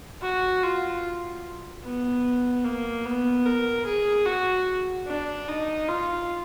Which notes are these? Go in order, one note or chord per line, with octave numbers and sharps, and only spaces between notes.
F#4
F4
B3
A#3
B3
A#4
G#4
F#4
D4
D#4
F4